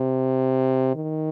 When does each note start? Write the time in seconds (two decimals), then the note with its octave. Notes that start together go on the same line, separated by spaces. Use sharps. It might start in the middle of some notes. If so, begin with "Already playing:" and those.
Already playing: C3
0.95 D#3